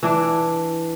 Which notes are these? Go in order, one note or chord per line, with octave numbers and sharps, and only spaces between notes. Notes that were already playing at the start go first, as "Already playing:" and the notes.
E3 D4